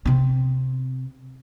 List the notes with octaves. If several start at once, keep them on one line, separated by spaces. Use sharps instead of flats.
C3 C4